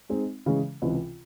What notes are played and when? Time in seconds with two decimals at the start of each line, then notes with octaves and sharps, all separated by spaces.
0.09 G#3 C4 D#4
0.46 C#3 E3 G#3
0.82 C#2 C3 E3